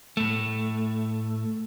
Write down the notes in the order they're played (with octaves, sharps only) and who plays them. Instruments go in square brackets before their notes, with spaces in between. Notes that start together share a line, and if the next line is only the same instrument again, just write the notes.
[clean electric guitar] A2 A3